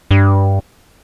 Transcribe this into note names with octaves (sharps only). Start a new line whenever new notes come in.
G2